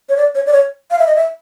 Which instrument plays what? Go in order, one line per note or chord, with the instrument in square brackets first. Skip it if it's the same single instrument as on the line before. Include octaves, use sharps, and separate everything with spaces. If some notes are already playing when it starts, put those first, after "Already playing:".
[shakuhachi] C#5
D5
C#5
D5
C#5
F5
E5
D#5
E5